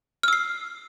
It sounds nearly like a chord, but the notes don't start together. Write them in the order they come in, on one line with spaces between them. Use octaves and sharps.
F6 E6 C7